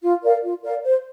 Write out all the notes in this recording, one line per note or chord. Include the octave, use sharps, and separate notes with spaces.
F4
A#4 D5 F5
F4
A#4 D5 F5
C5